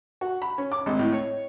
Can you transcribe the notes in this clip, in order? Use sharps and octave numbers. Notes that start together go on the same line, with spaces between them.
F#4
B5
C#4
D6
G#1
A2
C#5